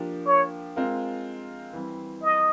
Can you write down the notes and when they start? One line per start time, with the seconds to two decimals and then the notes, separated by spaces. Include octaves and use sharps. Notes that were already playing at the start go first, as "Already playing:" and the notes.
Already playing: F3 A#3 D4 G4
0.27 C#5
0.76 G#3 C4 F4 A#4
1.73 E3 G3 C4
2.23 D#5